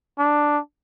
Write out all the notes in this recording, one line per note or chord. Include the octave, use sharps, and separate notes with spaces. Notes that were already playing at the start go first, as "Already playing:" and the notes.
D4